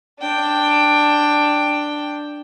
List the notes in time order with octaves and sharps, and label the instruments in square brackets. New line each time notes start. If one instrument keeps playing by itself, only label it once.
[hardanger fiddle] D4 G5